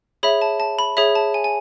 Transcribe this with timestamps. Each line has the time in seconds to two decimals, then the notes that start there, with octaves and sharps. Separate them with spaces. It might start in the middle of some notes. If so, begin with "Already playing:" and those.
0.23 G#4 C#5 E5 B5
0.42 A5
0.60 A5
0.79 B5
0.97 G#4 C#5 E5 B5
1.15 A5
1.34 G#5
1.44 G#5